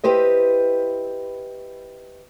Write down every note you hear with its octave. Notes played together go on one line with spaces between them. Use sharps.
E4 G4 B4 C5 D#5